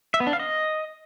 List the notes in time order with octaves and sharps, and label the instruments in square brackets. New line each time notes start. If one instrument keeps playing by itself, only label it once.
[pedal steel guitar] E5
B3
D4
F5
D#5